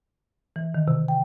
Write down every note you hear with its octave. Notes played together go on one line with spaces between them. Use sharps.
E3
D#3
C3
G5